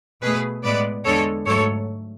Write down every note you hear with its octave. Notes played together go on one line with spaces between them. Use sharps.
B2 A3 G#4 B4
A2 G#3 B3 B4 D5
E2 D3 G#3 A4 C#5
G#2 F#3 A3 A4 C#5